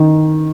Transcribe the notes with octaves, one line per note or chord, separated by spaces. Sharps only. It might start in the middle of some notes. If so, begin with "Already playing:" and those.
Already playing: D#3